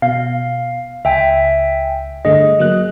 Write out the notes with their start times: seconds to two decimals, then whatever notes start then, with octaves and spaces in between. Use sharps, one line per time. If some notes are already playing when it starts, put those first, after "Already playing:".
0.02 B2 F5
1.05 C#2 E5 G5 G#5
2.25 G2 D3 A3 G#4 D#5
2.59 F#3 A#3 F#6